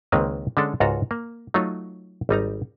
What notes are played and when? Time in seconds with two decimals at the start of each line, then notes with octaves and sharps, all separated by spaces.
0.12 C#2 D#3 G#3 A#3 C4 B4
0.57 D3 G#3 C#4 D4 A4
0.80 C#2 G#2 F4 F#4 A4 A#5
1.11 A#3
1.54 F#3 A3 D#4 F4 C#5
2.29 G#1 G3 D#4 A#5